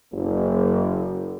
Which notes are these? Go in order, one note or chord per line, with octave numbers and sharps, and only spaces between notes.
F#1